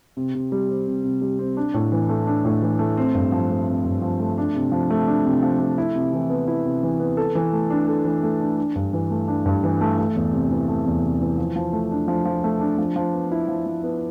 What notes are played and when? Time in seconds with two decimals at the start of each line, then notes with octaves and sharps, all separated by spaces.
0.17 C3
0.35 C3
0.52 G3
0.69 C4
0.87 C3
1.04 C3
1.22 G3
1.39 C4
1.57 D4
1.74 A2
1.92 E3
2.09 A3
2.27 D4
2.45 A2
2.62 E3
2.79 A3
2.97 C4
3.14 G2
3.32 F3
3.49 A3
3.67 C4
3.85 G2
4.02 F3
4.19 A3
4.38 D4
4.55 C3
4.72 F3
4.90 A3
5.07 D4
5.25 C3
5.43 F3
5.60 A3
5.78 E4
5.95 C3
6.13 E3
6.30 B3
6.48 E4
6.65 C3
6.83 E3
7.00 B3
7.17 A4
7.35 E3
7.53 A3
7.70 D4
7.88 A4
8.05 E3
8.23 A3
8.40 D4
8.57 D4
8.76 G2
8.93 E3
9.11 A3
9.28 D4
9.46 G2
9.64 E3
9.81 A3
9.98 A3
10.15 E2
10.33 C3
10.50 E3
10.68 A3
10.86 E2
11.03 C3
11.21 E3
11.38 F3
11.56 F3
11.73 A3
11.91 D4
12.08 F3
12.25 F3
12.44 A3
12.61 D4
12.78 F3
12.96 F3
13.13 B3
13.32 E4
13.48 F3
13.66 F3
13.83 B3